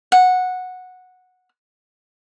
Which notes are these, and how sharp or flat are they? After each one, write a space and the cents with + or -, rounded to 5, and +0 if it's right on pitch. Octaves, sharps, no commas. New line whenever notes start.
F#5 -10